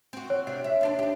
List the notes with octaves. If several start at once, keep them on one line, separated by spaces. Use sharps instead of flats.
C4 F#4
C#5
C3 D4 F4
E5
D#2 D4 C5
D4 G4